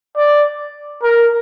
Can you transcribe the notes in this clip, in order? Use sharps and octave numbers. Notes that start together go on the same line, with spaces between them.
D5
A#4